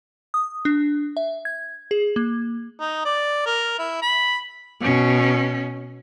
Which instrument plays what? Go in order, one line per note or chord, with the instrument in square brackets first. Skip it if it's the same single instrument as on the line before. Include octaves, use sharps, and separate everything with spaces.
[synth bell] D#6
D4
E5
G#6
G#4
A#3
[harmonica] D#4
D5
A#4
E4
B5
[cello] B2 C#4